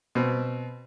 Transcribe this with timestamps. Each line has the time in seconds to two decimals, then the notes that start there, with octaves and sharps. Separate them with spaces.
0.15 B2 C4